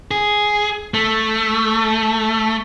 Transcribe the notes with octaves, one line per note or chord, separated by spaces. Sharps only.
G#4
A3